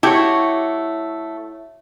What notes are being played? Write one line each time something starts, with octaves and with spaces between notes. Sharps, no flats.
A3 E4 F#4 G4 C#5